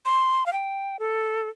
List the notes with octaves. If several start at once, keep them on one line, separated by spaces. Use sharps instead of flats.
C6
F5
G5
A4